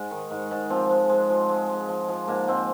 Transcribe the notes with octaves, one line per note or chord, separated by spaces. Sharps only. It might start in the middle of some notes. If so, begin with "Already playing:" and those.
Already playing: G#2 G#3
D#3
G#2
G#2
F3 C4
G#3
G#3
F3
G#3
G#3
F3
F3
G#2 A#3
G#2 C4